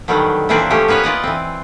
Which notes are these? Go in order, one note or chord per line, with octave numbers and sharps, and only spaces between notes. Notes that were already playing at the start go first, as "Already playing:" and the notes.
B2 D3 D#3 F#3 G3
A#2 E3 A#3 C4 D4 B4
F3 A3 C#4 G4
A#3 B3 B4 C#5 G#5
F4 B4 D5 D#5
E3 C4